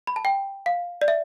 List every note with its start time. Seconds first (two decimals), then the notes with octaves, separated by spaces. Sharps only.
0.07 B5
0.16 A5
0.25 G5
0.66 F5
1.01 D5
1.08 E5